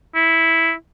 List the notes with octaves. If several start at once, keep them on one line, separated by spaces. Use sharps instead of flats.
E4